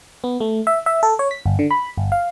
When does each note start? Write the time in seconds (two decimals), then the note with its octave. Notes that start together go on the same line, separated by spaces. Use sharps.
0.24 B3
0.40 A3
0.67 E5
0.86 E5
1.03 A4
1.19 C#5
1.31 B6
1.46 G1
1.59 D3
1.71 B5
1.97 G1
2.12 F5